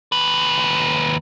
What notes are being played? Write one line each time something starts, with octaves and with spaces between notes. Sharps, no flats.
D#2 B4